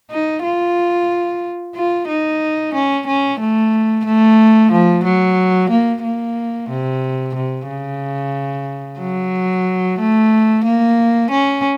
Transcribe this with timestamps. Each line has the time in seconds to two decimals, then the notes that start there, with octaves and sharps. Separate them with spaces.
0.11 D#4
0.43 F4
1.75 F4
2.08 D#4
2.74 C#4
3.07 C#4
3.40 A3
4.05 A3
4.71 F3
5.04 F#3
5.70 A#3
6.03 A#3
6.70 C3
7.35 C3
7.69 C#3
9.00 F#3
9.99 A3
10.65 A#3
11.31 C#4